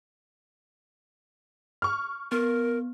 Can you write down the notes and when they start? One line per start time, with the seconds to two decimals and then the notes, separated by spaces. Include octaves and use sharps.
1.82 C#6 F6
2.32 B3 A#4